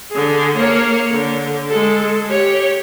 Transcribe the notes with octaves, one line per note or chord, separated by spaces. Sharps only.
D3 G#4
A#3 C#5
D3
G#3 A4
G4 C#5